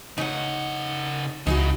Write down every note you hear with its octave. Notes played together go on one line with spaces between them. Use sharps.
C#3 D#4 C#5 F#5
C#2 C#3 D#4 E4 F#4